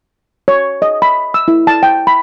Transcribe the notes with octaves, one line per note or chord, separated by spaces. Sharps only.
C#5
D#5
B5
E6
E4
A5
G5
B5